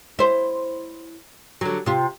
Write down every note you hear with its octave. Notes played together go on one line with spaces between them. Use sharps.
E4 C5
D3 F#3
C3 F4